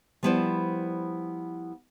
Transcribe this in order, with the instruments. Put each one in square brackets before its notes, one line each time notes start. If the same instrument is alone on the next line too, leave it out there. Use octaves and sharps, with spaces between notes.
[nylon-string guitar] F3 G3 B3 E4 C5 D5